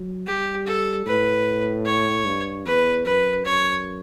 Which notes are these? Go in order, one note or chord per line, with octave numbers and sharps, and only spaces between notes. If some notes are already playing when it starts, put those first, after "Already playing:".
Already playing: F#3
G3 G4
A4
A2 B4
C#5
G2
E2 B4
F#2 B4
F#2 C#5